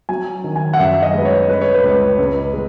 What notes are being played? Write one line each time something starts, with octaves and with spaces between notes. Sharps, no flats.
F#3 G#5
D#3
G#5
F#5
F#2 E5
D#5
G#3 B4
C#5
G#3 B4
C#5
B4
C#2
C#2
G#3